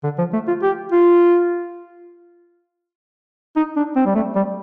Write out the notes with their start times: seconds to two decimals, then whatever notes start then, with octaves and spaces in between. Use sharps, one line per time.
0.03 D3
0.18 F3
0.33 A3
0.48 F4
0.62 G4
0.92 F4
3.56 D#4
3.76 D4
3.96 C4
4.06 G3
4.15 A3
4.35 G3